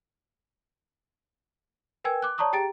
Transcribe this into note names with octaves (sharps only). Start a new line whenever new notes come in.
A#4 B4 G5 G#5 E6 G#6
D6 F#6
C#5 D5 A5 A#5 C#6 D#6
G4 G#4 G5 A#5 A6 D7